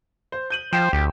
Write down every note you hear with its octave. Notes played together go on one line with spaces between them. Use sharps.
C5
G6 D#7 F#7
F3 C5 G5 E7
D2 G4